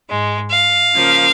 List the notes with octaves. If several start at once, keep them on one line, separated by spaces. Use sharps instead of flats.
G#2 G#3
F5
C#3 F3 A#3